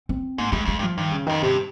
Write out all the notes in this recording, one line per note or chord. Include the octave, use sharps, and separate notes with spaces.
C4
G#2 A#3
G2 G#3
F2 G#3
G2
F3
G2 D#3
C#3
F2 D#3
G2 C3